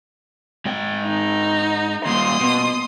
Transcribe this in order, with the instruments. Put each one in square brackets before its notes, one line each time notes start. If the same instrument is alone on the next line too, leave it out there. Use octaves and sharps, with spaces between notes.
[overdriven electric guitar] G#2 G5
[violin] D#4
[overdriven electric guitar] D#2 A#2 [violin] C6 D#6
[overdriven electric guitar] B2